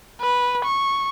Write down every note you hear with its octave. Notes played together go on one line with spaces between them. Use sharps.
B4
C#6